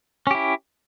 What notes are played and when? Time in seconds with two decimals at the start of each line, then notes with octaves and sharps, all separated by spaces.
0.27 C#4
0.31 G4
0.35 E4